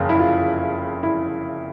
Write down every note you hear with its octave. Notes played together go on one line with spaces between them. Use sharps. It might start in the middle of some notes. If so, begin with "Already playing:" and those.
Already playing: F#1 F2 C#3
E4
F4
E4